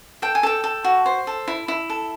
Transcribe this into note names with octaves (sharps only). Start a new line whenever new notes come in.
A4 G5
G#5
A4 G5
A4
F#4
C5
A4
E4
E4
A4